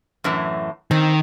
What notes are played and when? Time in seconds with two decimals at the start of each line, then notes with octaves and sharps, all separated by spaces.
0.24 F#2 A2 E3
0.91 D#3 C4